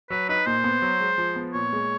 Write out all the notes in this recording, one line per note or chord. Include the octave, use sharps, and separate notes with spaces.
F#3 B4
D#4 B4
A#2 C5
B3
F#3
G#3
F3
B3
A#2 C#5
G#3